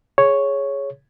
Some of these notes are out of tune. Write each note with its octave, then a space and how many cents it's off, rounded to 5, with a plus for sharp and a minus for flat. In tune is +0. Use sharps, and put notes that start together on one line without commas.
G#4 +0 C#5 +0